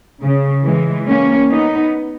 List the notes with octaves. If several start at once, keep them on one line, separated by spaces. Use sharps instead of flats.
C#3
E3 G#3
A#3 C#4
B3 D#4